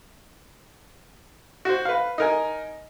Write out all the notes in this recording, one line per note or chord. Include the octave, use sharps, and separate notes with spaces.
F#4 C5
B4 F5
D#4 A#4 G#5